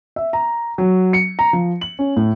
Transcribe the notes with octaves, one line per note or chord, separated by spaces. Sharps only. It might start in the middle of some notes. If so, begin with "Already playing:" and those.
E5
A#5
F#3
C#7
A#5
F3
F#7
C#4
A2